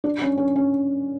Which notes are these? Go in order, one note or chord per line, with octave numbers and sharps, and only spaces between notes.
D4
C#4
C#4
C#4